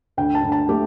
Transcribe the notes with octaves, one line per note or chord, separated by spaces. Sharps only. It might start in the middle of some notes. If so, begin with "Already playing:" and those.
D2 G5
A5
D2
A5
A3 G4